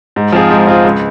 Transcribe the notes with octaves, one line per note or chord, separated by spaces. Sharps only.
G#2
F3 C4 F4 G#4
G#2
F3 C4 F4 G#4
C#2